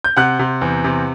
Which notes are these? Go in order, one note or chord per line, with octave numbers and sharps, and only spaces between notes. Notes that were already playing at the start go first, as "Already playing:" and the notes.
G6
C3 F#5 F#6
C3
E2
C3